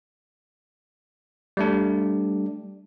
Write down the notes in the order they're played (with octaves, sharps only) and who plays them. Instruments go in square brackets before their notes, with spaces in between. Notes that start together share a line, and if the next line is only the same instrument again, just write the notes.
[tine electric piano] G3 A3 D4